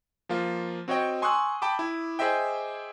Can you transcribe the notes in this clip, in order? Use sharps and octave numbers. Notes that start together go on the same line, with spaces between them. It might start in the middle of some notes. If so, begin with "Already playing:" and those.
F3 A#3 F4
C4 F#4 C#5 D#5 G5
G#5 C6 C#6 D#6 E6 F#6
G5 A5 B5 D6
E4
G#4 C5 D#5 E5 G5